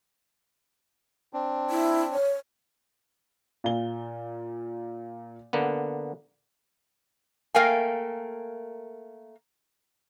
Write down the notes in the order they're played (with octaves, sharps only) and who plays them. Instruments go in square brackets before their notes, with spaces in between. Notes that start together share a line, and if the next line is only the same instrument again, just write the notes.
[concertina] C4 D4
[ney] E4
C#5
[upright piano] A#2 F5 G7
[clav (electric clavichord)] D3 A#3 B3
[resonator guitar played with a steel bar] A3 A#3 A#4 F5 G5 G#5